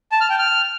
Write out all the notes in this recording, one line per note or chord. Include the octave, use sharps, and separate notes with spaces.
A5
F6
G5
F6